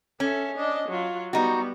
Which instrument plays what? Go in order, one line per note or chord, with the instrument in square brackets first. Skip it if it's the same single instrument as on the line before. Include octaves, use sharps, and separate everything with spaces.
[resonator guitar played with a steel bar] C#4 [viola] A4 E5
[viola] D4 D#5
F#3 F4
[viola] G3 B3 [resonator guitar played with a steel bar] D#4 F#4